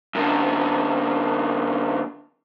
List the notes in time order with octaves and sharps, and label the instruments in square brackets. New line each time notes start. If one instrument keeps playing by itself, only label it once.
[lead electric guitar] F#2 D3